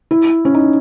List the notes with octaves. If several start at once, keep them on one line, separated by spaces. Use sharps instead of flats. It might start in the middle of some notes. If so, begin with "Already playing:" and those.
E4
C#4
D#4